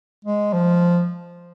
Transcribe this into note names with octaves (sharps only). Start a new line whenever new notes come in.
G#3
F3